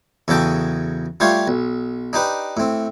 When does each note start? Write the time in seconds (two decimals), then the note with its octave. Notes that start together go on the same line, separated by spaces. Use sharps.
0.28 E2 C#3 F#3 A4 G5 A5
1.20 G3 A3 F4 G4 C#5 F5
1.48 B1
2.13 D4 D#4 G4 B4
2.57 A2 C4